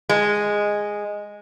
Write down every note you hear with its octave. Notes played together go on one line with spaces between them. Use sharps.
G#3